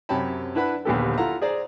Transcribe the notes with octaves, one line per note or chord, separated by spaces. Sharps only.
F#2 C3 C#5 G5 A5 B5
D4 E4 B4 F#5 B5
A#1 D#2 D3 B3 G4 A4
E4 F4 A4 F5 F#5 A#5
G#4 C5 D5 A#5